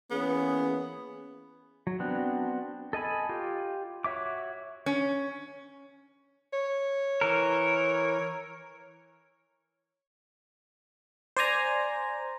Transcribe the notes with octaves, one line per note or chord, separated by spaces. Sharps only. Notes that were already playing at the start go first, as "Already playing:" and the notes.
E3 A#3 B3 C#4 G#4
F#3
B3 C4 D4 F#4
A4 D#5 G#5 B5
F4 G4
F#4 C#5 E5 D6
C#4
C#5
E3 A#4
C5 D5 G#5 A#5